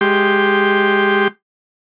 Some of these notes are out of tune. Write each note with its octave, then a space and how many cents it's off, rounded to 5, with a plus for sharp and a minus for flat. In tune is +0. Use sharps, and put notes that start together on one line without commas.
G#3 -5 G4 +0 C6 +5